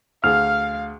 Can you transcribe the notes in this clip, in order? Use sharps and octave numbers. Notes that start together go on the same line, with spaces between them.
D2 G#4 F5 F6